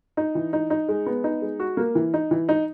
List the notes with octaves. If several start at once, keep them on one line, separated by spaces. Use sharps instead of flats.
D#4
E3
D#4
D#4
G#3
B3
D#4
G#3
F#4
A#3
E3
D#4
E3
D#4